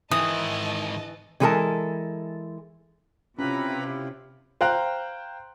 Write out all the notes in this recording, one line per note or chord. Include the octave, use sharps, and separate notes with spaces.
G#2 D#3 E3 D#5 A5 D#6
D3 E3 G#3 A4 A#4 A5
C3 C#4 E4 F4 G4 B4 A#5 B5
C5 F5 G5 A#5 F#6